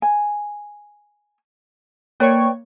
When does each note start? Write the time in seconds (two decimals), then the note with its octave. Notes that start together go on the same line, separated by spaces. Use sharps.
0.02 G#5
2.20 A#3 B4 C#5 D5 G5 C#6